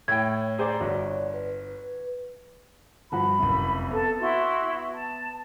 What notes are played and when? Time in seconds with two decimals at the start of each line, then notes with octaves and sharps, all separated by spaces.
0.08 A2 C#5 G5 G#6
0.59 G#4 C5 D5 A#5
0.80 G1 F#4 C#5 D5
1.34 B4
3.12 G2 F3 F#4 B5
3.39 F1 C2 F#2
3.91 B3 A4
4.20 E4 F#4 C6
4.92 A5